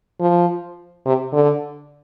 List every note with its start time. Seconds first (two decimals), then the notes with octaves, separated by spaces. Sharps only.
0.20 F3
1.06 C3
1.33 D3